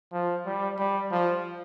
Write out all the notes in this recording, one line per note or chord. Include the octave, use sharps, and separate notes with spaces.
F3
G3
G3
F3